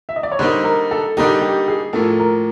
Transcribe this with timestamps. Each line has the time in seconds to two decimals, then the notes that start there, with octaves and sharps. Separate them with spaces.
0.09 E5
0.16 D#5
0.23 D5
0.32 C#5
0.39 D3 G3 A#3 D#4 C5
0.64 A#4
0.91 A4
1.17 D3 G3 A#3 D#4 G4
1.41 G4
1.68 G#4
1.93 A2 F3 A#3 A4
2.20 A#4